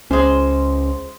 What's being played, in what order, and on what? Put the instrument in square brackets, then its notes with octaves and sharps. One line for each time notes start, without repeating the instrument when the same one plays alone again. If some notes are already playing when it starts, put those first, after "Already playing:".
[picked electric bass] C#2 C#4 [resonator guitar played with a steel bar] G#3 C5